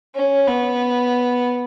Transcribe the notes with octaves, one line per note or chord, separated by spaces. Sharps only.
C#4
B3